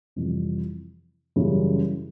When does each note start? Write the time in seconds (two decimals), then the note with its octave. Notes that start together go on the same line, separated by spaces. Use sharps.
0.16 F2 C3 E3 G3
1.36 F#2 C#3 E3 G3